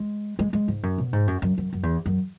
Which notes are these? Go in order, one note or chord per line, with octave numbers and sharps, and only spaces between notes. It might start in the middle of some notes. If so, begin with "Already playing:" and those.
Already playing: G#3
G#3
G#3
G#2
F#2
B2
G#2
F#2
F#2
F#2
F#2
E2
F#2